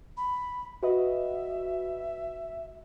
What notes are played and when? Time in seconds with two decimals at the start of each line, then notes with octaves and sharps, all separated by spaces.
0.17 B5
0.83 F#4 B4 D#5 E5